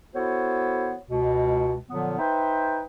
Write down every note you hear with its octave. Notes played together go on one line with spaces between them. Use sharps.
B3 E4 F#4 A4 C5 C#5
C#2 B2
A#2 D3 F3 F#3 B3
D#4 B4 C5 E5 G5